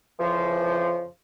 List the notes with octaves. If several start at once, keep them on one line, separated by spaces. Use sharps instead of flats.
F2 C#3 E3 F3